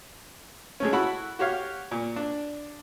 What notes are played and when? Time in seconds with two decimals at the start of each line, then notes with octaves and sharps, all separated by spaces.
0.80 G#3 A3 C#4
0.93 E4 F#4 A4 B5
1.39 F#4 G4 C#5 F5
1.91 A#2
2.16 D4